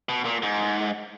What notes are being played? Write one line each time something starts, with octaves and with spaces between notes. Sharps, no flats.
B2
A#2
G#2